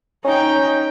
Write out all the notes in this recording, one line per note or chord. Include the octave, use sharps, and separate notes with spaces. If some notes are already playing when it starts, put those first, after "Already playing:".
C#4 D#4 G5